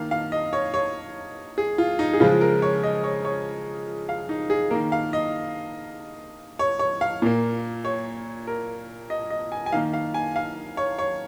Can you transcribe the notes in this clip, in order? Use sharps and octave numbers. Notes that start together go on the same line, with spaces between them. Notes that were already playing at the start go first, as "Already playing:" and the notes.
Already playing: D#3 A#3 F5
F5
D#5
C#5
C#5
G#4
F4
D#4
G#4
C#3 F3 G#3 F4
A#4
C#5
D#5
C#5
C#5
F5
D#4
G#4
D#3 A#3 A#4
F5
D#5
C#5
C#5
F5
A#2 A#3
C#5
A#4
D#5
D#5
G#5
G#5
D#3 A#3 F5
F5
G#5
F5
C#5
C#5